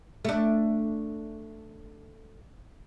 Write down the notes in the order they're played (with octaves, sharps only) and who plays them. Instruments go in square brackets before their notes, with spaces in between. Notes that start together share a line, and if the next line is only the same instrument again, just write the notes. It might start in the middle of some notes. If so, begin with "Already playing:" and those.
[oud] A3 D4